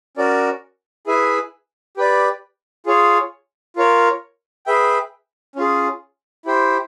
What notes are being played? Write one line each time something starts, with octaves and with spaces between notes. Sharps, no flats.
C#4 F#4 A#4 D5
E4 G#4 B4 E5 G#5
G4 B4 D5
F4 G#4 C#5
F4 A#4 C#5
G#4 B4 E5 G5
C#4 F4 G#4
E4 G4 C5